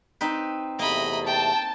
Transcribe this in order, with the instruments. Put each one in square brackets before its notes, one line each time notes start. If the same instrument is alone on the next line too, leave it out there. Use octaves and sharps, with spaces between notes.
[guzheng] C4 D#4 B4
[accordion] E2 C3 A3 [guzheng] A#3 [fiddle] D#5 B5
[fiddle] G5 [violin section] A5